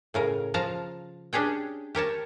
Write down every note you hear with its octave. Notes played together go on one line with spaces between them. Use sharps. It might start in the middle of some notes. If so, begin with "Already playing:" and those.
A2 C#3 A#4
F3 F5 A5 A#5
C#4 D4 G4 G#4 G5
G4 A#4 C#5 A5